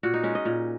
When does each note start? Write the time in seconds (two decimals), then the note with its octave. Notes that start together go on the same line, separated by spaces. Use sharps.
0.03 A#2 F#4
0.14 D#4
0.23 G#3 C#4
0.35 D#5
0.45 A#2